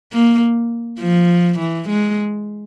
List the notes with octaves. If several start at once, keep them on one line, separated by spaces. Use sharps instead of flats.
A#3
F3
E3
G#3